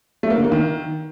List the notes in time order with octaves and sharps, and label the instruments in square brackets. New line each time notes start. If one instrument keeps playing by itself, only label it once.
[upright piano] A3
A#3
D3
A#3
D#3